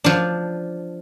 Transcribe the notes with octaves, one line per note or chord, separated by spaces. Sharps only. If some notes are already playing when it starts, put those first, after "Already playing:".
F3 D4